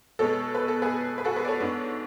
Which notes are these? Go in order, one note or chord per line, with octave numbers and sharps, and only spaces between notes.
B2 G#3 B3 A4 C#5
B4
A4
G#4 B4
B4
F#4 A4
G#4 B4
D5
A4 C#5
G#2 G#3 B3 D4